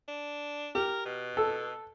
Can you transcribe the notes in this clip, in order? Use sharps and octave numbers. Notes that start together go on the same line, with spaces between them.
D4
G4 A#4
B2
A4